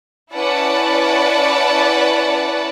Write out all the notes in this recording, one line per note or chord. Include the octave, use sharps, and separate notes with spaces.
C#4 E4 B4 D5 F#5 A5